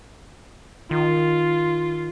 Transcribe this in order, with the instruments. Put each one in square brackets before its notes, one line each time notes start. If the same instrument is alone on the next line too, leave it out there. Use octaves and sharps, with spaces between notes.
[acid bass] D#3 [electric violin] F4